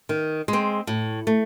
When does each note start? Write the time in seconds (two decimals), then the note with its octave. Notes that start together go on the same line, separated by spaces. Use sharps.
0.09 D#3
0.48 G#3
0.53 C4
0.87 A2
1.27 A3